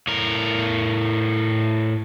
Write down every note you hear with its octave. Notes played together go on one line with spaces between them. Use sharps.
A2 A#4